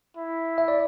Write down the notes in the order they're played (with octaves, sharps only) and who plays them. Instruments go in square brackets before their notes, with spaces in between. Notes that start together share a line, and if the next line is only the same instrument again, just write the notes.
[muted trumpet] E4
[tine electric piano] E5
D5